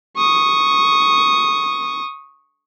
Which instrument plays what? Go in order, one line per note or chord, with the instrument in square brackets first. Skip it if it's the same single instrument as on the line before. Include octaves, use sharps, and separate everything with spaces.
[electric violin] C#6 D#6